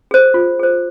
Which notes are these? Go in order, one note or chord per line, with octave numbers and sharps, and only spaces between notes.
G#4 C5
F4
G#4 C5